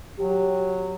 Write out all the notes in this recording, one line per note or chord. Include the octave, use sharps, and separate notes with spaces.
F#3 G4